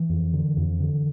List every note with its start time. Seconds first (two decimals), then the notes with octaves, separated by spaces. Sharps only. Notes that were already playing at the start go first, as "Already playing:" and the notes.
Already playing: E3
0.09 F2
0.33 D3
0.57 F2
0.80 D3